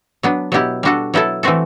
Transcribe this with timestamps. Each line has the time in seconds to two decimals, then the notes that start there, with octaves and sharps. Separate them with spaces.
0.23 F#3 B3 D4
0.52 B2 F#3 B3 E4 G4
0.83 G3 D4 F#4 A4
1.14 F#3 B3 E4 A4
1.43 E3 A3 C4 F#4 A4